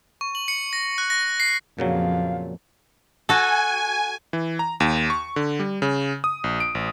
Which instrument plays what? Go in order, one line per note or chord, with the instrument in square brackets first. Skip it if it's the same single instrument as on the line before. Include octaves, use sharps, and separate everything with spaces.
[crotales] C#6
F#7
C#7
A#6
F#6
A#6
C7
[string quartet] F2 [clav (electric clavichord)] A#2 C#3 F#3 [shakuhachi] F5
[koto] F#4 A4 [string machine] G#5
[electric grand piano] E3
A#5
D#2
C#6
D3
G3
C#3
D#6
A#1
D7
A1